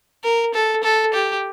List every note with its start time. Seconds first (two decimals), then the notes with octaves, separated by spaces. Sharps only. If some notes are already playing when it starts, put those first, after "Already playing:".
0.23 A#4
0.54 A4
0.83 A4
1.14 G4